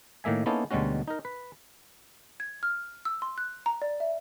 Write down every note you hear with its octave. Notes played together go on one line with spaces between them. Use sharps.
A2 D#3 A#3 E5 G#5
A#3 B3 C#4 D#4 E4 A4
D2 B2 G3 G#3 C#4 F#4
D#4 A#4
B4
G#6
F6
E6
C6
F#6
A#5
D5
E5